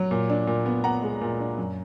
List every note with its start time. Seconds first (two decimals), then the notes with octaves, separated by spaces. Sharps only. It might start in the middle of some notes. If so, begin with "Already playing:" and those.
Already playing: F#3
0.11 A#2
0.30 D4
0.47 A#2
0.66 B3
0.84 B3 F#5 A#5
1.02 G#3
1.21 A#2
1.40 D4
1.58 F#2